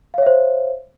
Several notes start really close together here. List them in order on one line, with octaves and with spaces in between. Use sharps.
F5 C#5 E5 C5